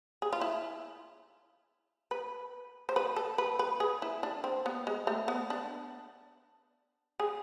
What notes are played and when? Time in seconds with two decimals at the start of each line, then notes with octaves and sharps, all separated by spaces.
0.22 G#4
0.33 F4
0.41 E4
2.11 B4
2.89 C5
2.96 B4
3.16 A4
3.38 B4
3.59 B4
3.80 G#4
4.02 E4
4.23 D4
4.44 C4
4.66 B3
4.87 G#3
5.07 A3
5.28 B3
5.50 D4
7.20 G#4